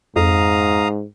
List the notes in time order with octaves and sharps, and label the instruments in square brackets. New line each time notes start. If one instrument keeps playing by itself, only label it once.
[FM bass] F2 [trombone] G#2 [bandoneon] F5 A#5 D#6